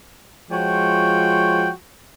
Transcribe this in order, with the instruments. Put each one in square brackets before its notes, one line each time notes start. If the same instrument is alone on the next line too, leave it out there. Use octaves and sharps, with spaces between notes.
[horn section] F3 G#3 F4 F#4 C#5 G5